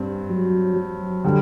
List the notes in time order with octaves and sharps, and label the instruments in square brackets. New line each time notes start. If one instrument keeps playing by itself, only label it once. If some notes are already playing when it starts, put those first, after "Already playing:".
Already playing: [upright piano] G2 C4
[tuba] F#3
F#3
[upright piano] D3 G3